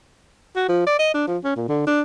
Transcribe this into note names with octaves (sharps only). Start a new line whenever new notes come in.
F#4
F3
D5
D#5
D4
F3
C#4
A#2
D3
D4